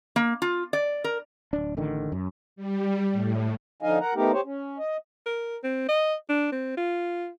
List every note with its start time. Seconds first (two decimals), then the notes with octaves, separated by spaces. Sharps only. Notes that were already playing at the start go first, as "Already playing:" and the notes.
0.16 A#3
0.42 F4
0.73 D5
1.04 A#4
1.53 D1 D4
1.77 A1 D3 D#3
2.12 F#2
2.56 G3
3.12 A2
3.82 D3 F3 D#4 D#5 F5 G#5
4.00 A#4 F#5 A#5
4.15 A3 B3 D#4 G4 A#4
4.33 G4 C5 C#5
4.45 C#4
4.79 D#5
5.26 A#4
5.64 C4
5.89 D#5
6.29 D4
6.52 C4
6.77 F4